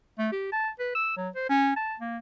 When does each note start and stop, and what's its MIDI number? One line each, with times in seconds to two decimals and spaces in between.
0.18 0.29 57
0.32 0.51 67
0.52 0.69 81
0.79 0.94 71
0.95 1.15 88
1.17 1.29 54
1.35 1.45 72
1.49 1.75 61
1.76 1.94 81
2.00 2.17 58